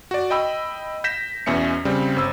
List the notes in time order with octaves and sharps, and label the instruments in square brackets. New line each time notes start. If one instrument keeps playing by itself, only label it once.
[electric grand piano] F#4 D5
D#5 G5 B5 E6
G6 A#6 B6 E7
E2 B2 C#4 E5 C#7
C#3 G3 C4
G1 C5 E6